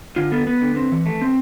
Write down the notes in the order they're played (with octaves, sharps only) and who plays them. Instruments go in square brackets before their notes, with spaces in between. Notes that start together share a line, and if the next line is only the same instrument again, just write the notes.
[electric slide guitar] D3 F4
B3 A4
B3 B4
D3
C4
E3
A3
C4